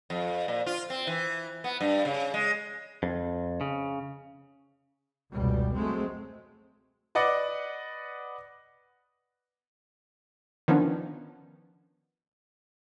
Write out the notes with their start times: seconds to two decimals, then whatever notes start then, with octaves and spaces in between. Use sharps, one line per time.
0.10 F2
0.48 A#2
0.66 F4
0.90 C4
1.07 E3
1.64 B3
1.81 G2
2.05 C#3
2.34 G#3
3.03 F2
3.61 C#3
5.34 F1 C#2 B2 G3
5.75 F#3 G#3 A3 C4
7.15 B4 D5 D#5 F#5 D6
10.68 D#3 F3 B3 C#4 D4